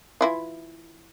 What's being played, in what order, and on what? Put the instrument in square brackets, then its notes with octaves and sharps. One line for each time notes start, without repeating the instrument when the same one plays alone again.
[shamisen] E3 E4 F4